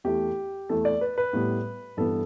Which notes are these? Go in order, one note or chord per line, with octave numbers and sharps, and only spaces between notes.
E2 E3 A3 G4
E2 E3 A3 A4
D5
B4
B4
A2 G3 B3
G2 E3 B3 A4